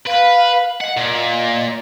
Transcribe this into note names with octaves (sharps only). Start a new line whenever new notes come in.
B4 F5
D#5 F#5
A#2 D#5